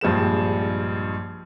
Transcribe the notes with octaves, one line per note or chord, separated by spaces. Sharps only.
A#1 G2 F3 G#3 E7